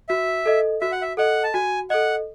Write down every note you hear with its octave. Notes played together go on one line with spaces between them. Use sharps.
F#4 E5
A4 D#5
F#4 E5
F#5
E5
A4 D#5 F#5
A5
F#4 G#5
A4 D#5 F#5